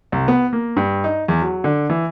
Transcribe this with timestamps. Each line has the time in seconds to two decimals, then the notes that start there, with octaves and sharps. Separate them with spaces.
0.12 C2
0.28 B3
0.53 A#3
0.77 G2
1.04 D#4
1.28 E2
1.42 F#3
1.64 D3
1.90 E3